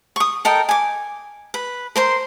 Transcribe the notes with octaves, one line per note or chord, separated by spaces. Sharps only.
C#6 D#6
A4 A#4 D#5 G5
G#5 D6
B4
A#4 C5 C6